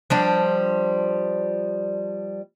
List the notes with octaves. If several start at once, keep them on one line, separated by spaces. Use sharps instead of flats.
F3 G3 D4